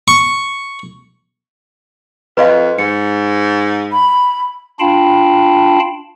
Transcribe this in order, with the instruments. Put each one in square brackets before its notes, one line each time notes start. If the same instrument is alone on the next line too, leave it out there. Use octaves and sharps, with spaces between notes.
[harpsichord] C#6
[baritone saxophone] F2 [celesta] B4 D#5 F5
[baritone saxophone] G#2 [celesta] C#7
[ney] B5
[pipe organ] D4 F4 F5 G5 A5 B5